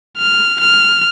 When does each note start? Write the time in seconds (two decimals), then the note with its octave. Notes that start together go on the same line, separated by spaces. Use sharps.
0.18 F6
0.60 F6